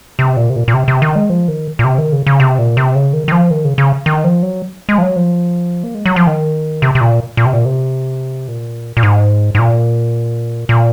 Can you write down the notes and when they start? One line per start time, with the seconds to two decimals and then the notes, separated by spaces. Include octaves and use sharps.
0.19 C3
0.37 A#2
0.50 C3
0.56 A#2
0.68 A#2
0.74 C3
0.88 C3
1.02 D#3
1.16 G#3
1.30 F3
1.48 D#3
1.79 A#2
1.84 C3
1.98 D#3
2.12 C#3
2.27 C#3
2.40 C3
2.59 A#2
2.77 C3
2.95 C#3
3.13 D#3
3.28 D#3
3.32 F3
3.51 D#3
3.64 C#3
3.78 C#3
4.06 D#3
4.24 F3
4.43 F#3
4.89 G#3
4.98 F3
5.02 F#3
5.16 F3
5.84 A#3
5.95 G#3
6.06 F#3
6.16 F3
6.27 D#3
6.82 C3
6.95 C3
7.01 A#2
7.37 A#2
7.46 C3
7.53 A#2
7.65 C3
8.48 A#2
8.97 A#2
9.03 G#2
9.55 G#2
9.59 A#2
10.69 A#2